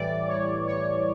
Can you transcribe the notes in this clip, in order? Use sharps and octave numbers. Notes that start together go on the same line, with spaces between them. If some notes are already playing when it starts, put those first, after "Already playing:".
Already playing: A2 E3 G3 D5
C#5
C#5